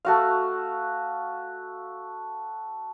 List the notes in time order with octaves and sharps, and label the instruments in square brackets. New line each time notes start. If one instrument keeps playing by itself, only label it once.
[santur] A3 F#4 F5